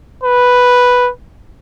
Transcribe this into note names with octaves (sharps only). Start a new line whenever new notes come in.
B4